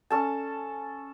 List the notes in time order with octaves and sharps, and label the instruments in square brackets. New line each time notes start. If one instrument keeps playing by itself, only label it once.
[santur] C#4 A4 A5